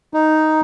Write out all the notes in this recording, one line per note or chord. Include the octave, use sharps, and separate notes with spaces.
D#4